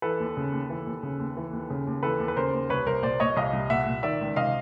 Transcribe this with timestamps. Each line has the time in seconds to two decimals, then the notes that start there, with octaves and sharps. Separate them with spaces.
0.02 E3 A4 B4
0.20 D#2
0.37 C#3
0.52 D#2
0.70 E3
0.86 D#2
1.03 C#3
1.20 D#2
1.37 E3
1.53 D#2
1.70 C#3
1.87 D#2
2.03 E3 A4 B4
2.19 D#2
2.28 B4
2.36 C#3 A#4 C5
2.53 D#2
2.69 C2 B4 C#5
2.86 C2 A#4 C5
3.03 A#2 C5 D5
3.20 A#2 C#5 D#5
3.36 C2 D#5 F5
3.53 C2
3.70 A#2 E5 F#5
3.86 A#2
4.03 D#3 D5 E5
4.21 C#2
4.36 C3 D#5 F5